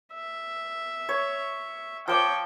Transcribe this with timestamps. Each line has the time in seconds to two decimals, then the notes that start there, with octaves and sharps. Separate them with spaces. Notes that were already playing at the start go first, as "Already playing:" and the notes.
0.14 E5
1.09 C#5
2.08 F3 C5 C#5 G5 D6